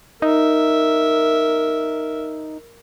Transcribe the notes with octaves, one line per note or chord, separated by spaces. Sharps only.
D#4 A#4 E5